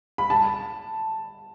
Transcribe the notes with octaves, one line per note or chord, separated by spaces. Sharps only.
B5
A5